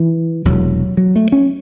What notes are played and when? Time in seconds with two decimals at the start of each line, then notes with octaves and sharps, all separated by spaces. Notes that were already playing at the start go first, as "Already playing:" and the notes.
Already playing: E3
0.45 E1 E2 C3 F#3
0.97 F#3
1.16 A3
1.32 C#4